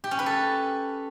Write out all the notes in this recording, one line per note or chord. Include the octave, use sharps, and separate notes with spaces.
G4
C#4
B4
A4